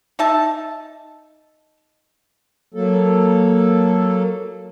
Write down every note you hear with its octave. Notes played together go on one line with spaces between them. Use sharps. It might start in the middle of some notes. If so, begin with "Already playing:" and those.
D#4 E5 A5
F#3 A#3 A4